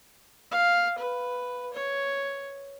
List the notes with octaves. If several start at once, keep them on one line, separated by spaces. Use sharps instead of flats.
F5
B4
C#5